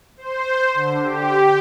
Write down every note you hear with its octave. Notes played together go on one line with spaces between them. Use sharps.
C5
D3
G4